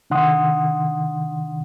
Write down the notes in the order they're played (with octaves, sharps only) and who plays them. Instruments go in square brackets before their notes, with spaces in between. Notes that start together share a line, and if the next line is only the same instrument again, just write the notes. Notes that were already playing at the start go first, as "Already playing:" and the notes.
[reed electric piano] C3 D#3 D4 F#5 C6 D#6